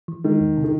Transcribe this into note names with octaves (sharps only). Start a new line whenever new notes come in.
E3
D#3 G#3
E2
C3
D#3